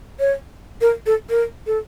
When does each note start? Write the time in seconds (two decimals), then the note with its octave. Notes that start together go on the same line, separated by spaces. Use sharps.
0.20 C#5
0.81 A#4
1.06 A4
1.30 A#4
1.67 A4